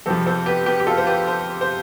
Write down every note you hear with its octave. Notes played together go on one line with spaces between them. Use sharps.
F2 C3 F3 A4 C5
A4 C5
G4 B4
G4 B4
G4
F4 A4
C5
G4 B4
A4 C5
C5